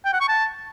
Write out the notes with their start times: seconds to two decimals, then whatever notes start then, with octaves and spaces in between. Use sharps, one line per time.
0.05 G5
0.13 F#5
0.21 C#6
0.29 A5